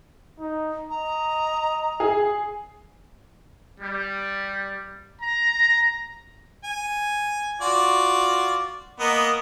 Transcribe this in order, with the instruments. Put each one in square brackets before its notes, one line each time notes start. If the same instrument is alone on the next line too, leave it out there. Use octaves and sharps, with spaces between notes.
[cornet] D#4
[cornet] D#5 [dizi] A#5
[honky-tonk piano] G#4
[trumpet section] G3
A#5
[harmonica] G#5
F4 F#4 D5
A#3 B3 D#5